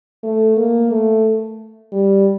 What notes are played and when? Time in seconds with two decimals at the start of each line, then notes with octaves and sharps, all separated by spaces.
0.23 A3
0.57 A#3
0.91 A3
1.92 G3